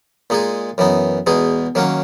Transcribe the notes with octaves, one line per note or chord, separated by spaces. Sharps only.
A#2 G#3 D#4 G#4
F#2 E3 B3 D#4
E2 B2 G#3 D#4 G#4
D#3 F#3 A#3 C#4 F#4